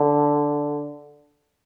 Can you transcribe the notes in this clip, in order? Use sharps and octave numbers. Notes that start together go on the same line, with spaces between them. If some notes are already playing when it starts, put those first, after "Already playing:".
Already playing: D3